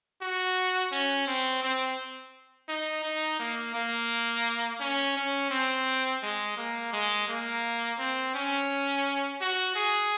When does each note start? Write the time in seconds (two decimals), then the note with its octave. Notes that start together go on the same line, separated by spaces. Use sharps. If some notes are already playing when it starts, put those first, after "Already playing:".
0.22 F#4
0.92 C#4
1.27 C4
1.63 C4
2.68 D#4
3.04 D#4
3.39 A#3
3.75 A#3
4.80 C#4
5.16 C#4
5.51 C4
6.22 G#3
6.57 A#3
6.93 G#3
7.28 A#3
7.98 C4
8.34 C#4
9.41 F#4
9.76 G#4